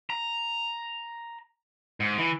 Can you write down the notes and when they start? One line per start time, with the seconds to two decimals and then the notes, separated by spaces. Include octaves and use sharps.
0.10 A#5
2.00 G#2
2.18 E3